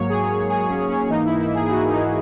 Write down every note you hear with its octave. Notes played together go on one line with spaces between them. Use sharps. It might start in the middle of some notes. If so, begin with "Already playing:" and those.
Already playing: G#2 F#3 A#3 C#5
G#4
G#4
C#4
C#4
G#2 E3 A#3 D#4
E4
E4
G#4
G#4
F#4
D#4